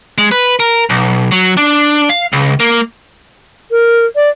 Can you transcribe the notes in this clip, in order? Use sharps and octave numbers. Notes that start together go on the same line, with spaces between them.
G#3
B4
A#4
B1
F#3
D4
F5
C#2
A#3
A#4
D5